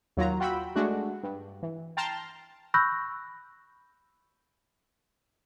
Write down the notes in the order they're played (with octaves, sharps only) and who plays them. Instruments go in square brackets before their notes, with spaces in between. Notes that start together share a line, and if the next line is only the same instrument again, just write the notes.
[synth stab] D#2 F#3 F4 A#5
F4 F#4 G5 B5 E6
G#3 A3 D4 F#4
G2
E3
G5 A5 A#5 C6 F6
[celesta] B5 C#6 E6 F#6 G6 A#6